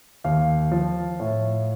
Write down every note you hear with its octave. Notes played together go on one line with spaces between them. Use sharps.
D#2 F5
F3
A2